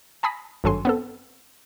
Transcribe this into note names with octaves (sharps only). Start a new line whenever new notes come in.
G#5 A5 B5 D#6 A#6 B6
G#1 G2 F#3 A4 G#5 C6
B3 C4 A4